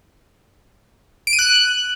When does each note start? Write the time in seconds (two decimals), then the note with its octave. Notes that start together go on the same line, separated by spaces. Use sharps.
1.27 D7
1.33 D#7
1.39 F#6